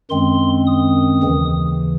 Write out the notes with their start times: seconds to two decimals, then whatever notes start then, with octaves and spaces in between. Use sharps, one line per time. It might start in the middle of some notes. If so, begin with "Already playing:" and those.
0.10 F#2 D#3 G#3 C4 C6
0.67 D#6
1.23 D#2 C#3 E3